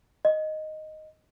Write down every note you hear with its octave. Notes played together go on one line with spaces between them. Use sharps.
D#5